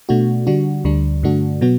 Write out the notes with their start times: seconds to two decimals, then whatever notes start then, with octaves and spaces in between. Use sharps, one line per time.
0.09 B2 A3 D4 F#4
0.47 D3 G3 D4 F#4
0.84 D2 D3 G3 D4
1.23 G2 D3 A3 D4 F#4
1.61 B2 F#3 B3 F#4